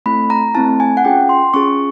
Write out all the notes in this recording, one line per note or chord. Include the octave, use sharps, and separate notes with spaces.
A3 C4 E4 B5
A#5
A3 C4 E4 A5
G#5
F#5
C#4 F4 G#4 G5
C6
C#4 F4 G#4 C#6